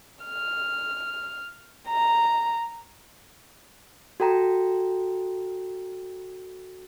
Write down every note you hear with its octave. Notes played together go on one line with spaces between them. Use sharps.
F6
A#5
F#4 A4 G5 A#5